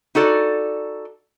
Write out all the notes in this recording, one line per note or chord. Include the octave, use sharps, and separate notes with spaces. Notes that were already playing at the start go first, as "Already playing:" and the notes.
D#4 F#4 A4 D5